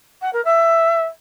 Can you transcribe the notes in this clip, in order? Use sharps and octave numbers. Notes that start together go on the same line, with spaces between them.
F#5
A#4
E5